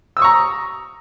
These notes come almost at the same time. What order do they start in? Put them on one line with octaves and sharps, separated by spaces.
E6 D#6 C#6 A#5